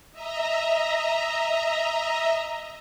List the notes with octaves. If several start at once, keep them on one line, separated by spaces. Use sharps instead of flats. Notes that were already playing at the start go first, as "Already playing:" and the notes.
D#5 E5 A#5